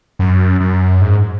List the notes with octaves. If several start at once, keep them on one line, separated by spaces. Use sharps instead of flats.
F#2
F#2
G#2